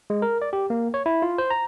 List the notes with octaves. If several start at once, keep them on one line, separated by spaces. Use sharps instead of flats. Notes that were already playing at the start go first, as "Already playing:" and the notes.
G#3
A#4
D5
G4
A#3
C#5
E4
F4
C5
A#5